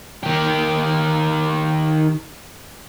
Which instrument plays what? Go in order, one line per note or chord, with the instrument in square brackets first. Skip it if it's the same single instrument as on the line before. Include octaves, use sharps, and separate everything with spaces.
[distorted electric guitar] D#3 G4